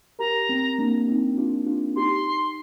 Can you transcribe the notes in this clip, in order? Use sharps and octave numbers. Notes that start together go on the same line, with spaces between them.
G4 A#4 A#5
C4
A#3 D4
C4 D#4
D4 F4
D4 F4
D#4 G4 C6